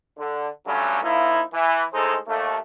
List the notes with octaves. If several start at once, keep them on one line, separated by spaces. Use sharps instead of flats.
D3
G2 D3 F#3 G3 A3 C#4
F3 A#3 D#4 E4
E3
A2 G#3 D#4 G#4 A4 C5
D#2 A3